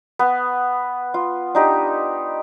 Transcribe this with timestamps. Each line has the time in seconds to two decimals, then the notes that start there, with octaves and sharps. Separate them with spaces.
0.19 B3
1.14 F4
1.55 D4 D#4 G4